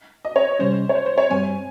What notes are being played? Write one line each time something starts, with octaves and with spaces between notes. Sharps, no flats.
D#5
C#5
C3 G3 C#4 C5
C#5
C5
C5
C#5
G2 G3 C4 G#5